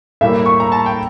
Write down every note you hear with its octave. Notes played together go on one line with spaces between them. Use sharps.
A2 G3 A#3 E5
C#6
A#5
A5
G5